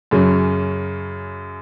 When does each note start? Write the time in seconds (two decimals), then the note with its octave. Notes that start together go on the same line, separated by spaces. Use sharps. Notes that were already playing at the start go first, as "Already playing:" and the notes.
0.11 F#2 C#3 F#3 C#4